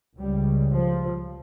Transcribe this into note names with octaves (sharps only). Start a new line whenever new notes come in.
C#2 C#3 G3
F3